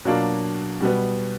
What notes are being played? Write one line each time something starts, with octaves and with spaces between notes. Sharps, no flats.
B2 F#3 A#3 D4 F4
B2 G3 B3